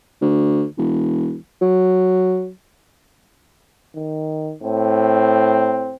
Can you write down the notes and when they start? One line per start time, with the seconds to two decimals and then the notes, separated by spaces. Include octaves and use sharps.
0.21 D2
0.78 E1
1.61 F#3
3.96 D#3
4.63 A2 C4